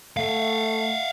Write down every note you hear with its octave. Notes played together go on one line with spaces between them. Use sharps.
A3 E5 F5